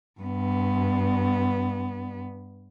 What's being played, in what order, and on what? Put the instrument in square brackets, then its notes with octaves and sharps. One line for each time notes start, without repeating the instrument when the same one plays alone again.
[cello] G2 B3